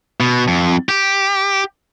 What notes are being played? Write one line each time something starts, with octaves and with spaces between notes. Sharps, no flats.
B2
F2
G4